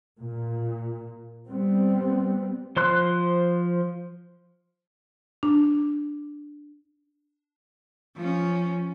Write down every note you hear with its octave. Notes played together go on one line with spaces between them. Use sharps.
A#2
G3 B3 C4
F3 C5 C6 F#6
D4
F3 C#4